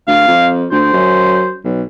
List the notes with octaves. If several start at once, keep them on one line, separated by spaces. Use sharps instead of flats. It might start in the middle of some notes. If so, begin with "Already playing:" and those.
D2 F5
F2
D2 C5
F#2
B1